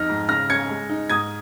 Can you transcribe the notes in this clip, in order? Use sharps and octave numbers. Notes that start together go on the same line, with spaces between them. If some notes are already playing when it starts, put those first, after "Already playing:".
Already playing: F2 D#4 F6 A#6
G#2
C#3 F6 A#6
C#4 G#6 C#7
G#3
D#4
G#2 D#6 G#6